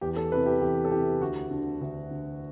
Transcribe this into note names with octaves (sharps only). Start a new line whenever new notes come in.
E2 G4
A4
C3 E3 B4
G4
E2 G4
A4
C3 E3 G4
D2 F#4
D3
D2
D3